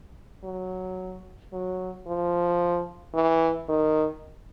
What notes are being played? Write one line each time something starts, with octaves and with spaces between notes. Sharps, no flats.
F#3
F#3
F3
E3
D#3